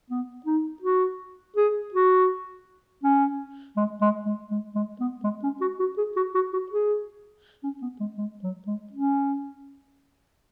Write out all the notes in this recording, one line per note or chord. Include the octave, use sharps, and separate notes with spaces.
B3
D#4
F#4
G#4
F#4
C#4
G#3
G#3
G#3
G#3
G#3
B3
G#3
C#4
F#4
F#4
G#4
F#4
F#4
F#4
G#4
C#4
B3
G#3
G#3
F#3
G#3
C#4